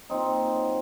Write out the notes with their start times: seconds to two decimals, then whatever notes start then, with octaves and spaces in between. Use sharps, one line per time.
0.10 A#2 C4 D#4
0.53 F#3